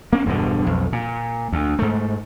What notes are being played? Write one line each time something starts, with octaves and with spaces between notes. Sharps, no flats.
A#3 C#4
E1 G2 B2 D3
B1 F2
A#2
D2
G#2 A3